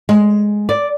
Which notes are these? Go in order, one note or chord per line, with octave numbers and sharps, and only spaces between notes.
G#3
D5